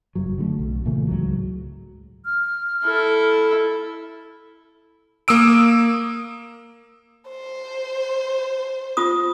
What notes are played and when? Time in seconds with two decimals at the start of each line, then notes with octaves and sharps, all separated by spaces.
0.15 F#1 G2 F#3
0.38 D3 G3 A3
0.59 B1
0.85 A#2 C#3 E3 A3
1.08 C#2 G#2 F#3
2.25 F6
2.84 E4 A4
5.28 A#3 D#6 E6 D7
7.30 C5
8.97 F4 D#6